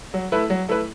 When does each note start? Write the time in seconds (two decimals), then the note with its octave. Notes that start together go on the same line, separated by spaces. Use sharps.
0.14 F#3
0.32 A3 E4 B4
0.50 F#3
0.69 A3 E4 B4